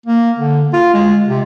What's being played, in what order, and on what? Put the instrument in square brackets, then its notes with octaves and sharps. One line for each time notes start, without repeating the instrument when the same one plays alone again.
[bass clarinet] A#3
D3
F4
G#3
C3